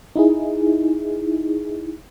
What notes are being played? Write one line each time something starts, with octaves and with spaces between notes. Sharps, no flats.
D#4 E4 G#4